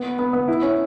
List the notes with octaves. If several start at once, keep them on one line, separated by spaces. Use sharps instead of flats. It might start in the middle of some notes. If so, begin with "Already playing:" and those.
Already playing: B3
B3
B3
E4
C#4